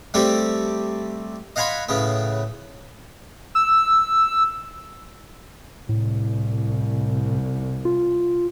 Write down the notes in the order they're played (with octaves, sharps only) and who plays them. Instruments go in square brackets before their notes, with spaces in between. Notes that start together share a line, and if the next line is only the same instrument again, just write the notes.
[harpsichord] G3 A3 C4 G4 A4
D#5 F5 F#5 G#5 B5 C6
A2 C#3 B3
[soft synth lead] E6
[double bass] C2 [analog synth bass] A2
[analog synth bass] F4